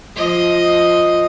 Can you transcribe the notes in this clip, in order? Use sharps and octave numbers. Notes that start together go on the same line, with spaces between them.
F3 D#5